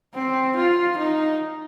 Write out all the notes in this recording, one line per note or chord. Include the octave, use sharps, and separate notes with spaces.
C4
F4
D#4